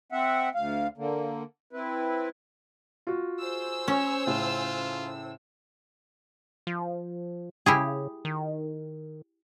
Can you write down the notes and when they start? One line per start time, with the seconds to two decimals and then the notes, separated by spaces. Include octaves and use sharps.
0.12 C4 E5 F#5
0.55 D2 F5
0.97 D3 A#3
1.73 C4 E4 B4
3.07 F4 F#4
3.40 G#4 C5 E6
3.88 C#4 C#5
4.27 A2 C#3 F4
6.67 F3
7.66 C#3 E4 G4 G#4
8.25 D#3